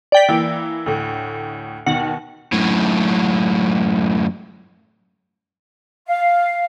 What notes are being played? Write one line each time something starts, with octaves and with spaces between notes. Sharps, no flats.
D5 G5 B6
E3 A#3 E4
D2 A2
D#2 B2 D#3 F#5
F#2 A2
F5